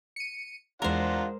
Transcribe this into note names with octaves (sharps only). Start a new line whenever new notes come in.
C#7 D#7
E2 G#3 D4 F4 A#4 C5 F#5 A#5